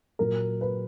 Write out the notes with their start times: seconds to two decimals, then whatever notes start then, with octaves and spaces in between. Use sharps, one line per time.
0.19 A#2 F#3 A#4
0.61 B4